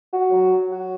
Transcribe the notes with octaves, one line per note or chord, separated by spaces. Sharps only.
F#4
F#3
F#3
F#4